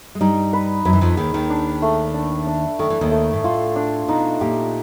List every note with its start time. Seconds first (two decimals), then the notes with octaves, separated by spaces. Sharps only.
0.15 G#3
0.21 G2 G3 D#4
0.53 B4
0.85 F#2 F#3 B4
0.93 E3
1.01 F2 F3
1.17 D#2 D#3 G#4
1.34 D#2 D#3
1.50 D4
1.82 A3
2.14 D4
2.47 D4
2.79 D#3 A3
2.90 E3
3.01 D#2 D#3
3.11 A3
3.33 G#2
3.44 A2 F4
3.76 D4
4.08 B2 D#4
4.41 A#2 G4